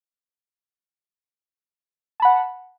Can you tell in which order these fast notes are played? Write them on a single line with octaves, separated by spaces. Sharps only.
A5 B5 F#5